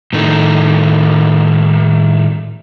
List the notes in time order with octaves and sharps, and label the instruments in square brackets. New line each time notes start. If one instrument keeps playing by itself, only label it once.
[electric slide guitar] A2 D#3 A3